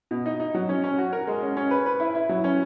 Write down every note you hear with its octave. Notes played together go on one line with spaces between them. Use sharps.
B2
D#4
D#4
F#3
C#4
C#4
F#4
A#4
G#3
C#4
C#4
B4
B4
E4
E4
F#3
C#4